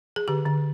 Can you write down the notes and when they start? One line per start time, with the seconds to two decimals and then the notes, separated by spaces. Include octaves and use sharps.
0.16 G#4
0.28 D3 G4
0.46 D3